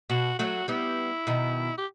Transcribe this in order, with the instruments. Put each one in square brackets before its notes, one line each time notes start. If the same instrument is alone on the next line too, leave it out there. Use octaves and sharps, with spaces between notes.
[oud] B2 [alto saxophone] F#4
[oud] F#3 A3 [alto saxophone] F#4
[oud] G3 B3 [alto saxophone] E4
[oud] B2 D#3
[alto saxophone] G4